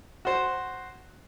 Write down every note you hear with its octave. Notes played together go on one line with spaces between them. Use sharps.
F#4 C5